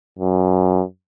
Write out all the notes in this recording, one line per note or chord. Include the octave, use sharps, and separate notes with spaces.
F#2